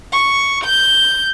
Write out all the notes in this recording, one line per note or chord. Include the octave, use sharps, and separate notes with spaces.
C#6
G6